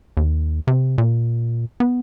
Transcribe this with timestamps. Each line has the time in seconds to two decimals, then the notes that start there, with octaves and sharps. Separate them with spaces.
0.17 D#2
0.67 C3
0.98 A#2
1.80 B3